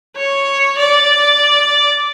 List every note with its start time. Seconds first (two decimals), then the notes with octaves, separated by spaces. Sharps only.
0.17 C#5
0.78 D5